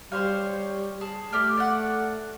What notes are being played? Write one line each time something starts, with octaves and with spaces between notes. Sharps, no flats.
G3 C5 C#5 F5
G#4 A5
A3 G4 D5 F6
D5 F#5